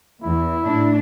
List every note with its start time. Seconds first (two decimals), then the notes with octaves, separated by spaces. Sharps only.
0.23 E2 E4
0.65 A2 D4